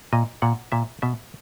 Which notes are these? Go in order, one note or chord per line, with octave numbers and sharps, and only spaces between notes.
A#2 D#5
A#2 F#5
A#2 E5
B2 E5